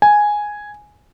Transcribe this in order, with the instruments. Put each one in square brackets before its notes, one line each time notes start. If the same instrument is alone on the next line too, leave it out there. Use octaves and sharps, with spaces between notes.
[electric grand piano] G#5